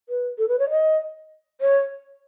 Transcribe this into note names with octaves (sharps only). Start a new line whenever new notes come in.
B4
A4
B4
C#5
D#5
C#5